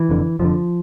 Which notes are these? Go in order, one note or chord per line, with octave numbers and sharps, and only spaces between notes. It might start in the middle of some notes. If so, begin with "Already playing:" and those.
Already playing: E3
F1 F2 D3
F1 F2 D3 F3